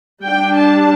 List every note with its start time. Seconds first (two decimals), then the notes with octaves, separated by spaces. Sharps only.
0.22 G3 D4 G5
0.56 A5